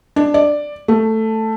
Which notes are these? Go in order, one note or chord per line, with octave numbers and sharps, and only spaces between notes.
D4
D5
A3